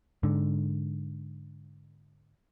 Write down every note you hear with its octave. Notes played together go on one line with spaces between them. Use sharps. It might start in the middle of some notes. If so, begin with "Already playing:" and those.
G#2 D3